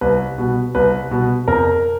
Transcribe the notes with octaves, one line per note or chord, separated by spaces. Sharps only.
C2 B4
B2
C2 B4
B2
F2 A#4